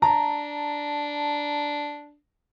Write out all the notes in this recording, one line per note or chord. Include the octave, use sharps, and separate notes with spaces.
D4 A5 A#5